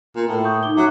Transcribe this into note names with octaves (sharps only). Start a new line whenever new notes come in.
A#2
A2
C#6 D#6 G6
D#4 D6 G7
F#3 E5 F#6